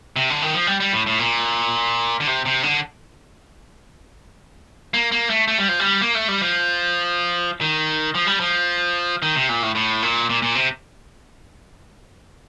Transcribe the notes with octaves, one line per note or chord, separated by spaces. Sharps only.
C3
D3
D#3
F3
G3
G3
A2
A2
A#2
D3
C3
C3
D3
A#3
A#3
A3
A3
G3
F3
G3
A#3
A3
G3
F3
D#3
F3
G3
F3
D#3
C3
A#2
A2
A2
A#2
A#2
A#2
C3